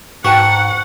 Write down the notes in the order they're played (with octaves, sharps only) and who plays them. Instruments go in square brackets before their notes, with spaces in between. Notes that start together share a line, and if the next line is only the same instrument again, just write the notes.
[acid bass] G#2 [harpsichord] F#4 [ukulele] B4 G5 A5 [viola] F#5